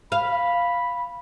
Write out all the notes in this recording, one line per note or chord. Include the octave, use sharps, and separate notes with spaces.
F5 B5